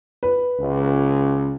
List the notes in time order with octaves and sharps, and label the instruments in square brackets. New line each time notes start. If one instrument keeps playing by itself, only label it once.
[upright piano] B4
[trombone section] C#2